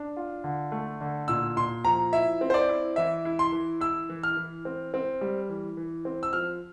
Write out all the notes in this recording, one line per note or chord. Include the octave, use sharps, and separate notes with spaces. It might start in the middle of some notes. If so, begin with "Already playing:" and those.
Already playing: D4
F4
D3
A3
D3
A#2 E6
A#2 C6
F3 A#5
E4 E5
C4
C5
D5
E4
E3 E5
E4
C6
E3
E4 E6
E3
F6
E3
C4
C4
G3
E3
E3
C4
E6
F3 F6